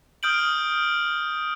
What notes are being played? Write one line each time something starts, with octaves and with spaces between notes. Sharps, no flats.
D#6 F6 G6 D7 F#7